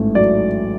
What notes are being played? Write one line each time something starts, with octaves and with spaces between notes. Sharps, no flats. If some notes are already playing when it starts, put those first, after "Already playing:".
Already playing: A1 G#2 A3
F#3 D5